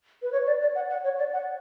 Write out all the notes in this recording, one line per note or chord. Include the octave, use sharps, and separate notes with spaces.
B4
C#5
D5
D5
F#5
F#5
C#5
D5
F#5